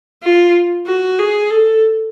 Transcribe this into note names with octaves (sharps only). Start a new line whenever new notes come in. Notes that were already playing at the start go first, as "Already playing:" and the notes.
F4
F#4
G#4
A4